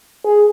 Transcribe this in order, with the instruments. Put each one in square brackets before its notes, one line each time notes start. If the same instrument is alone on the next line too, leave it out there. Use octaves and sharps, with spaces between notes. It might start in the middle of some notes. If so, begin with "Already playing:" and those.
[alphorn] G#4